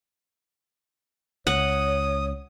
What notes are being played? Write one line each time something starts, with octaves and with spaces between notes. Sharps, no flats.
C#2 C#5 F#5 D#6